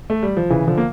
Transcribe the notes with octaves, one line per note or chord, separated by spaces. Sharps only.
A3
G3
F3
C#3 E3
D3 F3
A#3